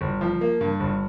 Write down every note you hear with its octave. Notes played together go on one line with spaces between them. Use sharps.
G1
F3
A#3
G2
G1